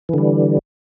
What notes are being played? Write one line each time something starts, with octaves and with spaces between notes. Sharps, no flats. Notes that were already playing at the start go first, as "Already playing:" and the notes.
D3 E3 G3